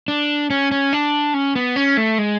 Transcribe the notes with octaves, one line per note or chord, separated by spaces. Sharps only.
D4
C#4
C#4
D4
C#4
B3
C#4
A3
G#3